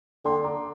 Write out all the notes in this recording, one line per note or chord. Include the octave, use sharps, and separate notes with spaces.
D3 G5 C6
A#5 D6